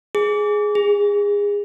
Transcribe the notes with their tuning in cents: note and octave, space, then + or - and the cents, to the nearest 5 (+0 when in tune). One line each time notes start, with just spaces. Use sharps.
G#4 +5
G#4 -25